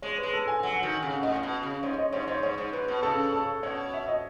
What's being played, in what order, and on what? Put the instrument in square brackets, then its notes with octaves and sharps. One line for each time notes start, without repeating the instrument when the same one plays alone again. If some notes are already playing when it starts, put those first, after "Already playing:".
[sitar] G#3 [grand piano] C#5
[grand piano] B4
[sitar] G#3
[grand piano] A4
G#5
[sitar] F#3 [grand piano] F#5
[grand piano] F#5
[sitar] D#3
C#3
[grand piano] F#5
[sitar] A2 [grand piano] D#5
[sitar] B2
C#3
[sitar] G#2 [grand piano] C#5
[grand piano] D#5
[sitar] G#2 [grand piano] C#5
[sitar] G#2 [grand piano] C#5
[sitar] G#2 [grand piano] C#5
[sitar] G#2
[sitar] G#2 [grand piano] B4
[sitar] B2
[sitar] C#3 [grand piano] A4
[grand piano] A4
[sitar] B2 [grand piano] C#5
[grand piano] E5
D#5